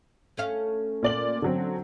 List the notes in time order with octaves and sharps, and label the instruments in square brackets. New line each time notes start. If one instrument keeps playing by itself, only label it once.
[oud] A3 C#4 F5
[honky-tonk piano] A#2 D5 F#7
D3 F#3 C4